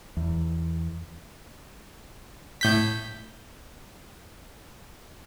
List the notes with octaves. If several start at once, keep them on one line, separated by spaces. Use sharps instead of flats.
E2
A2 G6 B6